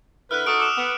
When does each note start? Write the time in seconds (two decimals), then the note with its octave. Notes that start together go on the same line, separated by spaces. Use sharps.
0.31 D3 E4 B4 F6 F#6
0.46 D#4 F#4 A4 D#6 D7
0.60 D6 E6 E7
0.77 B3